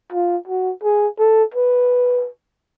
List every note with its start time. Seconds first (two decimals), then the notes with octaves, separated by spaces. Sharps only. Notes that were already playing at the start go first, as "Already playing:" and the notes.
0.12 F4
0.47 F#4
0.83 G#4
1.18 A4
1.54 B4